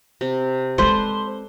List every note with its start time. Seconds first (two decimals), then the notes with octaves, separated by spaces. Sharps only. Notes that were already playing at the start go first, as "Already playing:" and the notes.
0.21 C3
0.78 G#3 C4 A4 B4 C5 D5